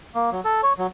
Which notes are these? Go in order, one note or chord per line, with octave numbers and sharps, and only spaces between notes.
A#3
F#3
A4
C#5
F#3